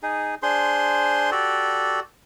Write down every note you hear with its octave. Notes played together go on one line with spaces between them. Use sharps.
D#4 G#4
D4 G#4 C5 C6
F#4 G4 A4 D5